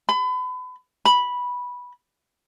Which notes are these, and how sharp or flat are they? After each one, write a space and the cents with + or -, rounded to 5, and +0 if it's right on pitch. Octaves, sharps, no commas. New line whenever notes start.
B5 +35
B5 -10